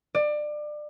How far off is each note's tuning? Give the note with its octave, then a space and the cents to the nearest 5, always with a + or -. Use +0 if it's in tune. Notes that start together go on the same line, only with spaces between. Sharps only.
D5 +25